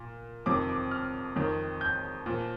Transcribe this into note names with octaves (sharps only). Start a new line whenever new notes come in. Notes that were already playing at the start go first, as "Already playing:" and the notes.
Already playing: A#2
F2 C3 D#3 D6
D6
F6
F2 D#3
G6
A#2 F3